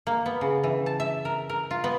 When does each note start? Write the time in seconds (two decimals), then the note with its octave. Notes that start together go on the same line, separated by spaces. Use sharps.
0.07 A#3
0.26 B3
0.41 C#3
0.64 E3
0.86 A5
1.00 E5
1.25 A#4
1.49 A#4
1.71 F4
1.84 B3